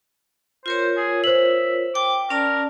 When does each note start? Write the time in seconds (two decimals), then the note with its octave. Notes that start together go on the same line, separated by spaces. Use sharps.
0.66 F4 A#4 C5 C#5
0.97 G#4
1.24 C5 E5 F#7
1.95 G5 D6
2.30 C#4 A#4 D5 A5